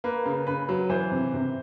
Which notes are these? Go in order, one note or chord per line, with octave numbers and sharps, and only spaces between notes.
A#3 B4
C#3
C#3 B4
F#3
E3 C5
C3
C3